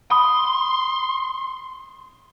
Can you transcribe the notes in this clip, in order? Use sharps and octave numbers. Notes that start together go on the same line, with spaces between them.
B5 C6 D#6